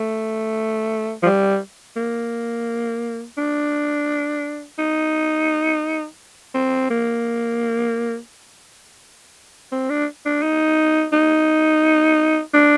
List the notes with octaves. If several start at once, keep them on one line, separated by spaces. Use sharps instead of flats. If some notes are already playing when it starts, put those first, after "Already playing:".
Already playing: A3
F3
G3
A#3
D4
D#4
C4
A#3
C4
D4
D4
D#4
D#4
D4